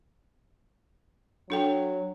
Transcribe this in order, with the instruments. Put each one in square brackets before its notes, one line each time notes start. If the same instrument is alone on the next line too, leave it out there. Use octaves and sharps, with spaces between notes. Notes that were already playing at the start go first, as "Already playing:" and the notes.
[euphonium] F#3 [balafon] D4 A4 G5